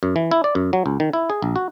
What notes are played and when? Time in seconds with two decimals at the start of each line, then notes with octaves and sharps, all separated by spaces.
0.03 F#2
0.16 E3
0.31 E4
0.44 D5
0.55 F#2
0.73 F#3
0.86 C#2
1.00 D#3
1.13 E4
1.30 G#4
1.42 A#1
1.56 F#4